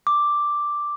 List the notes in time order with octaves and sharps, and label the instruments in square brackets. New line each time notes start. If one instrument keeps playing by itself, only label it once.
[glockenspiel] D6